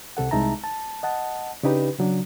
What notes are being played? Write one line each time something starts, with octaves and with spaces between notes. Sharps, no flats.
C2 C3 A4 F#5
C2 G#3 D#4 E5 A5 A#5
A5
D#5 F#5 A5
C#3 D4 D#4 G4 B4
C#3 F#3 D4